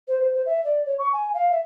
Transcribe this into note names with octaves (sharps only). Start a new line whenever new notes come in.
C5
C5
C5
E5
D5
C#5
C#6
G#5
F5
E5